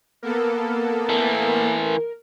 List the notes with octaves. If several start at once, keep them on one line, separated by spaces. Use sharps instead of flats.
A#3 B3 A4 A#4
E3 A3